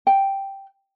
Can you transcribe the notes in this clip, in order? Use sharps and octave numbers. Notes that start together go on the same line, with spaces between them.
G5